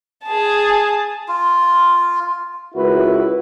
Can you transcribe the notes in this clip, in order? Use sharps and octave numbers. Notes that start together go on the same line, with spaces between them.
G#4 A5
F4
C#2 E4 F#4 A#4 B4